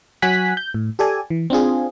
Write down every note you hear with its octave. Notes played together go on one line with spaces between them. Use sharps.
F#3 F#4 G#5 F#6 B6
G6
A2
G4 A4 D5 G#5
E3
C4 D4 F4 G#4